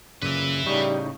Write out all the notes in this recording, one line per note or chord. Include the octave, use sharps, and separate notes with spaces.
F#2 A#2 C#3 B4 E5
A2 C#3 G3 D#4